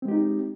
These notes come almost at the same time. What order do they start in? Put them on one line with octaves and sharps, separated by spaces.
C4 G#3 G4 D#4